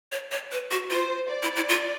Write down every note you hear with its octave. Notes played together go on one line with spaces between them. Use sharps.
C#5
C#5
B4
F#4
F4 C5
D5
E4
E4
F4